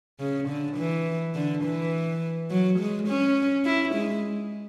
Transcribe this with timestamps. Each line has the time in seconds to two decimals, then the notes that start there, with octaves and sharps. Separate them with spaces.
0.20 C#3
0.49 D3
0.77 E3
1.35 D3
1.64 E3
2.50 F#3
2.79 G#3
3.08 C#4
3.65 E4
3.95 G#3